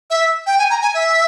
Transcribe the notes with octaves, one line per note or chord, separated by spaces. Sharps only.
E5
G5
G#5
A#5
G#5
E5